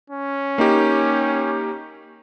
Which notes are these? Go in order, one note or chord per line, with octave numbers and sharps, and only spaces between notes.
C#4
A#3 D#4 G4